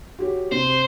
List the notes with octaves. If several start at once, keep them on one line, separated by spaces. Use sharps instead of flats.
F#4 G4 C#5
C3 C5